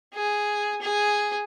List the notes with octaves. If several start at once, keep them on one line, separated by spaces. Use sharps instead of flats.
G#4
G#4